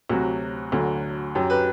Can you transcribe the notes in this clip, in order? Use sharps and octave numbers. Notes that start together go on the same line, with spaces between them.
D2 C3 F#3 F#4
D2 D3 F#3
F#2 F#3 G4
G4 B4